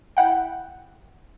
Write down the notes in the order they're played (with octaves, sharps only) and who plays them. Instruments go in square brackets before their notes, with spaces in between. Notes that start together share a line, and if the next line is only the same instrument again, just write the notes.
[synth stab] E4 F#5 G5